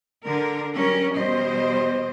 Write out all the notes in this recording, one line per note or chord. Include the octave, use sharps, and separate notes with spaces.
D3 A#4
F#3 G3 C#4 A#4
E2 B2 G3 C5 D#5